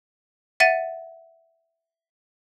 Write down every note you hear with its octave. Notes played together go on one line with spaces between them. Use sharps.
E5 F#5 A6 D#7